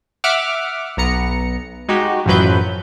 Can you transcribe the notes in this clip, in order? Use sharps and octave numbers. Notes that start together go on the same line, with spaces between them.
E5 F#5 D6 F6
B1 B3 A#5 C#7
G#3 D#4 F#4 G4
A1 F#2 F3 F#3 B4 G6